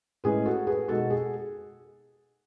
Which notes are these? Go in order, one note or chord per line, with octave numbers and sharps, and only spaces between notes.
A2 G#3 C#4 E4 G#4 B4
F#4 A4
G#4 B4
B2 G#3 D#4 F#4 A4
G#4